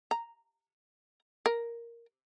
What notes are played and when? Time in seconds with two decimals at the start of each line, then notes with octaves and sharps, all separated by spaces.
0.11 A#5
1.46 A#4